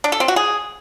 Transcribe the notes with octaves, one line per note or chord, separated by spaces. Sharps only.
D4
A4
C4
F#4
G#4